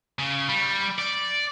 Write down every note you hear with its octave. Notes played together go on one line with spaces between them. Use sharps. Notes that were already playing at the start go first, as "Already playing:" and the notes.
C#3
G3
D5